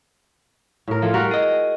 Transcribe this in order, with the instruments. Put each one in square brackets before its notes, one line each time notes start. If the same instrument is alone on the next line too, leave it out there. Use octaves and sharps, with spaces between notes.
[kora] A2 A#4
[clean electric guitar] F3 E4 A4 [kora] F4
[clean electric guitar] G3 [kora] F#4 A#4
[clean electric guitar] G#4 D#5